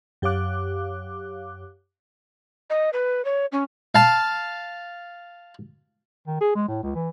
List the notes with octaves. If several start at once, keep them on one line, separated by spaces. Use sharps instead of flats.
F#2 G4 C#5 F5 D6 F#6
D#5
B4
C#5
C#4
F5 A5
D#3
G#4
G#3
A2
C#2
E3